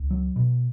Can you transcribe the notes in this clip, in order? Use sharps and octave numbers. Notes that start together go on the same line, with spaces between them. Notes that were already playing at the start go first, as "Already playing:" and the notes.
Already playing: C#2
F#3
B2